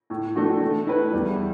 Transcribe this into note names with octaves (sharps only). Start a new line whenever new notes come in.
A2
E3 A3 D4 F#4
A3
E4 B4
E2 G3